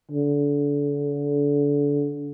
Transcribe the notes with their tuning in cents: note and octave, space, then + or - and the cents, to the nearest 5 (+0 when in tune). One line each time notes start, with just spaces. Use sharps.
D3 -30